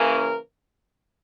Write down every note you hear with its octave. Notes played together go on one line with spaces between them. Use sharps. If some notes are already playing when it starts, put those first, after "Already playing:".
Already playing: C#3 E3 A#3 C#4 A#4